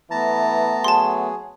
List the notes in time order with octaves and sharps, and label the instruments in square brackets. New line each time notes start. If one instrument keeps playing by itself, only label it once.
[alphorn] E3 [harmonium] A3 B3 [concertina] A5 A#5
[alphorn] F#3 [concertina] G#4 [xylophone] A5 C6